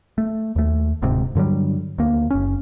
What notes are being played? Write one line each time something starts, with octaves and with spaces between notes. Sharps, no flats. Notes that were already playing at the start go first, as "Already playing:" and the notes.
A3
D#2 A3
D1 D2 G#2 C3
G2 D3 F#3 G3
D2 A#3
F#1 C#4